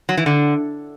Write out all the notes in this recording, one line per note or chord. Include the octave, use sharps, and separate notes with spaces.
F#3
E3
D3